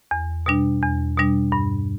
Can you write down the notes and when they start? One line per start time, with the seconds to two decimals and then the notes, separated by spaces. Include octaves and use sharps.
0.11 E2
0.46 B2 G3 D4
0.82 E2
1.18 B2 G3 D4
1.52 G2